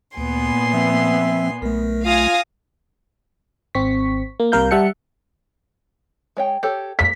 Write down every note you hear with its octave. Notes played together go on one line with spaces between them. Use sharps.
D2 A#2 B3 G#5 C6
F3 C4 E5
B1 A3 A#4
F4 F5 G#5 D#6 A#6
G#1 C4 C#6 B6
A#3
C2 C3 G3 A#4 F5 G6
G3 E5 F#5 A5 C#7
G#3 C#5 G5
G4 A4 C#5
A#3 B6